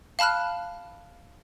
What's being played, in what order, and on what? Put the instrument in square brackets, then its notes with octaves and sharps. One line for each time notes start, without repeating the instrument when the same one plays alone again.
[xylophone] F5 A5 B5 F6 F#6